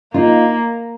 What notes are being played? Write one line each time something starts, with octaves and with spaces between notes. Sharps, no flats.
A#3 D#4 F4